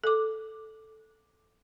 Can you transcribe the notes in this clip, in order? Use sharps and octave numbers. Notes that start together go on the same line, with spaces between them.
A4 D6